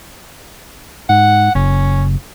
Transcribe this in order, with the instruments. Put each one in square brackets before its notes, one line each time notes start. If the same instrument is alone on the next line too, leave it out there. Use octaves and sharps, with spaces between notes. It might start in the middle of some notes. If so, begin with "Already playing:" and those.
[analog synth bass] G#2 [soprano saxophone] F#5
[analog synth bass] F#1 [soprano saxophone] C#4